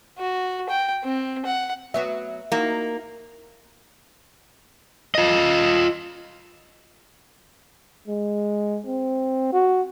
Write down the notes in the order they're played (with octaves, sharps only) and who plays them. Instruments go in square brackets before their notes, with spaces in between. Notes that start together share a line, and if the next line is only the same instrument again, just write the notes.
[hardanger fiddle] F#4
G5
C4
F#5
[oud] F#3 B3 F#4 [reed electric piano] E5
[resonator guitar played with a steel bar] A#3 [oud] D#4 E4 F#4
[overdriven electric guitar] F4 D#5
[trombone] G#3
C4
F#4